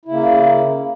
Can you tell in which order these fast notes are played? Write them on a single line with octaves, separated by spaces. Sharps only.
E4 C#3 A#3